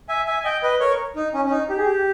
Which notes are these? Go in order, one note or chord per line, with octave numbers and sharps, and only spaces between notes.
E5 G#5
E5 G#5
G#5
D#5 G5
B4 D#5
A#4 C#5
D#4
C#4
C#4
D#4
G4
G#4
G4